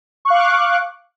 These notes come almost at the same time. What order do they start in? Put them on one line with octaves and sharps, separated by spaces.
C#6 F#6 F5 D6